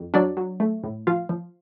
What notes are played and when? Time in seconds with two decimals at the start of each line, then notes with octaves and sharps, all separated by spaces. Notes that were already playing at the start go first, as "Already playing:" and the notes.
Already playing: F2
0.14 F#3 D4 D5
0.37 F#3
0.60 A3
0.84 A2
1.07 F3 F4 F5
1.29 F3